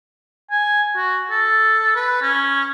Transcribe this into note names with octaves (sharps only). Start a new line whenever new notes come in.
G#5
F#4
A4
B4
C#4